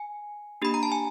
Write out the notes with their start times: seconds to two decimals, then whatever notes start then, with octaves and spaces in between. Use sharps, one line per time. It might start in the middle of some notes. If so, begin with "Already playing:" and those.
Already playing: G#5
0.62 A#3 D4 G4 B5
0.74 A#5
0.83 A5
0.92 G#5